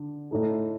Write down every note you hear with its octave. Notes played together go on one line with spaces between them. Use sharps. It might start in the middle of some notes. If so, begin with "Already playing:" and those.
Already playing: D3
A2 A3 D#4 A4